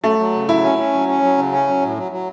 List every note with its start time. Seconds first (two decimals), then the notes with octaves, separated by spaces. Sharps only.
0.04 F#3 A3
0.19 F#3
0.34 C#3
0.48 F#3 E4
0.63 C#4
0.78 C#4
0.93 F#3
1.08 C#4
1.23 F#3
1.38 C#3
1.52 C#4
1.67 F#3
1.81 A2
1.97 F#3
2.12 F#3